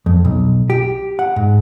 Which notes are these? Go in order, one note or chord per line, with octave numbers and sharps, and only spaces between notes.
F2
B1
G4
F#5
G#2